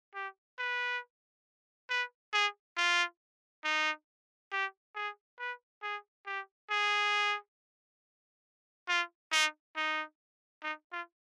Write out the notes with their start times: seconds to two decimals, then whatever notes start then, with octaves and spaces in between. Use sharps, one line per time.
0.15 G4
0.59 B4
1.90 B4
2.33 G#4
2.77 F4
3.64 D#4
4.52 G4
4.96 G#4
5.39 B4
5.83 G#4
6.27 G4
6.70 G#4
8.88 F4
9.32 D#4
9.76 D#4
10.63 D#4
10.92 F4